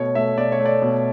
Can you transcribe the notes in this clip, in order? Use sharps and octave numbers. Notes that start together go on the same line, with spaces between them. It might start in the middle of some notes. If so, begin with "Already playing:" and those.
Already playing: B2 A3 C#5
A3 E5
B2 D5
C#5
A3
D5
B2